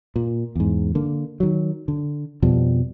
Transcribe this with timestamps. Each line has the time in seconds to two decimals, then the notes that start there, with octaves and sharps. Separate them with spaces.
0.16 A#2
0.55 E2 G#2
0.95 D3 A#3
1.40 D#3 F#3
1.88 D3
2.42 F2 B2 F3 G3